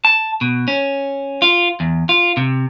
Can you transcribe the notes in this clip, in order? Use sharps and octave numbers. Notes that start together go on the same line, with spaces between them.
A5
B2
C#4
F4
E2
F4
C3